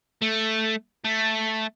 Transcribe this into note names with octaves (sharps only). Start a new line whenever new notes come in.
A3
A3